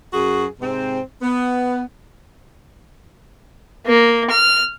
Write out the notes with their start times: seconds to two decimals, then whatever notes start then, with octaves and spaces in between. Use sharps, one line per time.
0.14 F#2 F#4 G#4
0.60 G#2 C3 C4
1.22 B3
3.87 A#3
4.30 F6